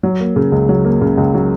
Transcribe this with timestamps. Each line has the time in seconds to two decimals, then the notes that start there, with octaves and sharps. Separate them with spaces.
0.03 F#3
0.20 A#3
0.36 C#3
0.52 C#2
0.69 F#3
0.85 A#3
1.01 C#3
1.17 C#2
1.34 F#3